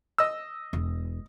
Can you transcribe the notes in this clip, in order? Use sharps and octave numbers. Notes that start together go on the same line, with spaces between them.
D#5 E6
E1